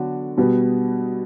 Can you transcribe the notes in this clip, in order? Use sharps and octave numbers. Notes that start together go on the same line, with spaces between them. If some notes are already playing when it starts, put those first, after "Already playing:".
Already playing: D3 F#3 B3 D4 F#4
B2 G3 B3